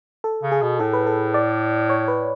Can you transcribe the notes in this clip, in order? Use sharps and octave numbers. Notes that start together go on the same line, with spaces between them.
A4
C#3
G#4
B2
A2 A4
B4
A4
D5
C#5
B4